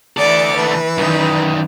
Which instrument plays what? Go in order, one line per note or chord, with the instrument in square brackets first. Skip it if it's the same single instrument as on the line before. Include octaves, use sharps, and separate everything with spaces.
[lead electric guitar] D2 A4 [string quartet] E3 D5 D6
[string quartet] E3 B4
[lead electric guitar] F#2 D#3